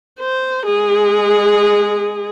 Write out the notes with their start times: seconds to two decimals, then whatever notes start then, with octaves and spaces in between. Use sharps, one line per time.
0.20 C5
0.66 G#3 G#4